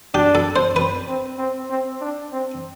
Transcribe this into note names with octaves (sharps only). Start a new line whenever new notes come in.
D4 G4
A4
C5
C4 B4
C4
C4
C4
D4
C4